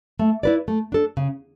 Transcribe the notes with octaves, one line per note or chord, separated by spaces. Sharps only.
A3
E4 B4 D5
A3
D4 A4
C#3